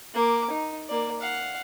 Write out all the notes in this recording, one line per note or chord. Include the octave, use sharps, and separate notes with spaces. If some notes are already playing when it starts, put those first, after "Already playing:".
A#3 D6
D#4
A#3 D5
F5 F#5